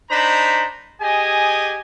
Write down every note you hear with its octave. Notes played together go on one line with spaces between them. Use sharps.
D4 D#4 C5 A#5 B5
G4 G#4 D#5 G#5